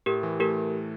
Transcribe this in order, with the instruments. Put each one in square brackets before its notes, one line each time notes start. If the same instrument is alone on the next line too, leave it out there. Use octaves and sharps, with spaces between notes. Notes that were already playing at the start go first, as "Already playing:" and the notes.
[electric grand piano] A2 [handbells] G4 A#4
[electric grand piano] E3
[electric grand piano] A3 [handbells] G4 A#4